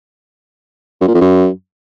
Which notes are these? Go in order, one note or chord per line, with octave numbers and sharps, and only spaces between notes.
F#2
A#2
F2
F#2